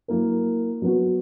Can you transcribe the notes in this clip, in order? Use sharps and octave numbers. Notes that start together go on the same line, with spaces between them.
F#3 A#3 E4 A#4
F#3 B3 F#4